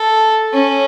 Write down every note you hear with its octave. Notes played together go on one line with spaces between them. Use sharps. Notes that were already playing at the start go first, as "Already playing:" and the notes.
Already playing: A4
C#4